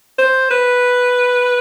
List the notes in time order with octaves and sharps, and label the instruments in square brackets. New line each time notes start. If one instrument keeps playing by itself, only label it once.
[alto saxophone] C5
B4